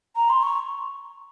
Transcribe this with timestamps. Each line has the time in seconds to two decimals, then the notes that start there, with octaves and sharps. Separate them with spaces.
0.16 A#5
0.30 C6
0.43 C#6